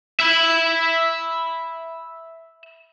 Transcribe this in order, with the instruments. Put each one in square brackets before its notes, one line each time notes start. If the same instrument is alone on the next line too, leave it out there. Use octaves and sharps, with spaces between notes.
[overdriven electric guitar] E5 B5